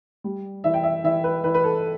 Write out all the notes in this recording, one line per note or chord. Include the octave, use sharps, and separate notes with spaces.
G3
E3 E5
G5
E5
E3 E5
B4
E3 B4
B4
A4